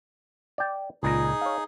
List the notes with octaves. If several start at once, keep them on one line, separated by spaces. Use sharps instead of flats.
D5 G5
C#2 A#2 D#4 G#4 A#5
C#5 F5